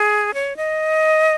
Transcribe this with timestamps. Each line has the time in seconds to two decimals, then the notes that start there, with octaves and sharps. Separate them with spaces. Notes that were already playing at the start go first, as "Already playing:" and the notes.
Already playing: G#4
0.34 C#5
0.57 D#5